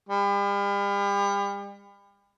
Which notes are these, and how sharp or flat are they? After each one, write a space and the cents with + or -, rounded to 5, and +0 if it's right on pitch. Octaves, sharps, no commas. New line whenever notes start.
G3 +40